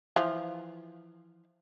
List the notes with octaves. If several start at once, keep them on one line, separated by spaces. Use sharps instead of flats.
E3 F3 F4